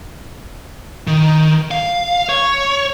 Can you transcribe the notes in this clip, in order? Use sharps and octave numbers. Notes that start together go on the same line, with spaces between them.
D#3
F5
C#5